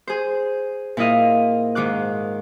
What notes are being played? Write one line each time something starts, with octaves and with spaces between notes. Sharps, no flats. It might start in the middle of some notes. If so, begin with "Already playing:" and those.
G#4 C5
A#2 E4 F4 D#5 F5
G#2 D#3 F4 D6 F#6